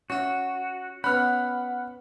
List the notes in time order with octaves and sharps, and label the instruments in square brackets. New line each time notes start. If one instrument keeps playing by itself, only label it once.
[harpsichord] C#4 E5 [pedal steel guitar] F#4
[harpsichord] B3 C#4 [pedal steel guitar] F#5 [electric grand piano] B5 F6